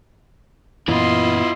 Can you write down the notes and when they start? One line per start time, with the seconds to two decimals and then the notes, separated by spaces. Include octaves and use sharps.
0.88 F#2 A#2 E3 B3 E4 F4 D#5 C6